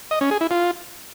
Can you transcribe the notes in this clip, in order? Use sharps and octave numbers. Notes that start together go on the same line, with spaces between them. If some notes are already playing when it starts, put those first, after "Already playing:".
D#5
C#4
G#4
E4
F4